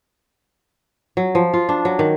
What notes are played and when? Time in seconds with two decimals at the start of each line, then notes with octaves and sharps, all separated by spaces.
1.17 F#3
1.35 F3
1.54 F4
1.69 D4
1.85 F#3
1.99 D#3